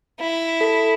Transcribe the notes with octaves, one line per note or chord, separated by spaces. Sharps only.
E4
A4 B6